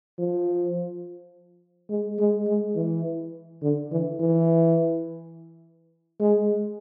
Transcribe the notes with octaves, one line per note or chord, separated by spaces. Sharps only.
F3
G#3
G#3
G#3
E3
D3
E3
E3
G#3